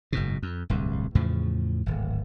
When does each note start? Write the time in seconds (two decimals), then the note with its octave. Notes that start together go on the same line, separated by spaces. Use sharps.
0.13 F#1 G#2 B2
0.43 F2
0.70 D1 C2 G2
1.15 E2 A2 C#3 F3
1.86 D1 G#1